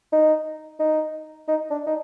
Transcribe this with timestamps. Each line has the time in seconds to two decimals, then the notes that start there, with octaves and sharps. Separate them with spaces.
0.13 D#4
0.80 D#4
1.48 D#4
1.71 D4
1.87 D#4